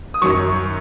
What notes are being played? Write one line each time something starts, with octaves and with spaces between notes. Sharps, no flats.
D#6
F#2 D#3 F#3 C#6